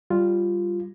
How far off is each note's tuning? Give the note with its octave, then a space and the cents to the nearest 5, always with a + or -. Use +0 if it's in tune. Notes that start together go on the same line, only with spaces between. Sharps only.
G3 +0 F4 +0